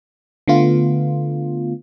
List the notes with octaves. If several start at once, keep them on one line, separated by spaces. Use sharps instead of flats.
D3 A3 B3 F4